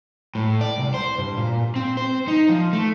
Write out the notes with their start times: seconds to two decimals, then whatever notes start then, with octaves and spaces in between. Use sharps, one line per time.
0.35 A2
0.61 D5
0.78 C2
0.94 C5
1.18 G2
1.38 A#2
1.76 C4
1.97 C5
2.28 D#4
2.49 F3
2.73 A3